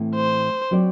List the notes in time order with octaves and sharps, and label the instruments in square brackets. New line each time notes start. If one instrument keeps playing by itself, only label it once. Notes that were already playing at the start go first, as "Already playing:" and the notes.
Already playing: [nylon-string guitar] A2 E3 A3 C4
[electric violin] C5
[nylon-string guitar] F#3 C4 F#4 B4 D5